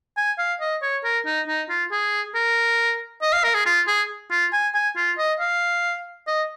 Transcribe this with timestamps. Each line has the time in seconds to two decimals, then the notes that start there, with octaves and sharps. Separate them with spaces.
0.17 G#5
0.39 F5
0.61 D#5
0.82 C#5
1.04 A#4
1.26 D#4
1.48 D#4
1.69 F4
1.91 G#4
2.35 A#4
3.22 D#5
3.33 F5
3.44 A#4
3.54 G#4
3.66 F4
3.87 G#4
4.31 F4
4.53 G#5
4.75 G#5
4.97 F4
5.18 D#5
5.40 F5
6.27 D#5